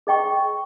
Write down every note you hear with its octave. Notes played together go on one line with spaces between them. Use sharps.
G#4 D#5 G5 C#6